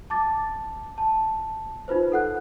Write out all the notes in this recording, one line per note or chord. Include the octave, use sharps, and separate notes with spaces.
A5 D6 A6
A5
D#4 F4 B4 C5
A4 F#5 F#6